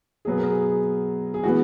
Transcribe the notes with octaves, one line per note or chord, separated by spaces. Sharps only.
B2 F#3 B3 G#4
A#4
G#4
G#4
E3 B3 F#4